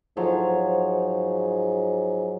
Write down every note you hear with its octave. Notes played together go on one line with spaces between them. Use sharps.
G#2 F3 F#3 C#5